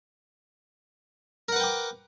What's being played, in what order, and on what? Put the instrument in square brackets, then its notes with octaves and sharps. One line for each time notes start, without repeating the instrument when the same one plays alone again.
[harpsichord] A#4
F#5
B4
G5
D6